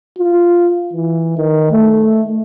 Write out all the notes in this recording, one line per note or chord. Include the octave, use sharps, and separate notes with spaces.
F4
E3
D#3
A3